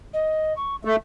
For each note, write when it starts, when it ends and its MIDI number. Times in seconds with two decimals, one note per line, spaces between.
0.14 0.53 75
0.57 0.76 85
0.85 0.96 57
0.85 0.96 76